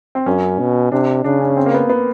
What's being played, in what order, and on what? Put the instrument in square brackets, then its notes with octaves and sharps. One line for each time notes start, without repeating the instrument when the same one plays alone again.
[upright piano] C4
[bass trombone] F#2 [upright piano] C#4
[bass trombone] B2
[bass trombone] C3 [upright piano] D4
[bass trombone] C#3 [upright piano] D4
[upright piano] C#4
C4
A#3
B3
B3